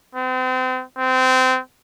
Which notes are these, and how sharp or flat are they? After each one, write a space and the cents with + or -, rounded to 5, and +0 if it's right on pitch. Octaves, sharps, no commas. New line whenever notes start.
C4 -35
C4 -25